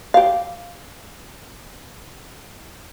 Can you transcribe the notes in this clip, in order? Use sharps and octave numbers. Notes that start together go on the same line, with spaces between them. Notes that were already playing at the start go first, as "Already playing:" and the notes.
G4 F5